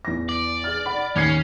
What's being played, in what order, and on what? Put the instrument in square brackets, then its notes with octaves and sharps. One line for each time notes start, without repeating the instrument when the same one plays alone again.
[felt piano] E2 A#6
[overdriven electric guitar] D5
[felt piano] G#4 F6
F#5 B5
[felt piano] D#2 G#6 C7 [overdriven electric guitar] C#4